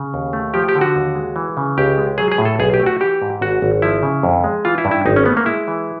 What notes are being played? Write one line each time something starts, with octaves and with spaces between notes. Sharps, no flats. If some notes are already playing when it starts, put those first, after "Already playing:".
Already playing: C#3
D#2
A3
F3 G4
G4
D3
F#4
D#2
G#3
E3
C#3
C#2 G4
G#3
F#3 G#4
G#4
A2
A4
B1 G#4
G4
A3
F#4
E3 G4
G#2
G#1 F#4
G#1
F3 E4
C#3
F2
G#3
E3 F4
E4
G2
E4
G#1 D#4
C#4
A3 B3
A#3
G#3 E4
E3